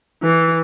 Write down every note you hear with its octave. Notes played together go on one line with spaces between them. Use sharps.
E3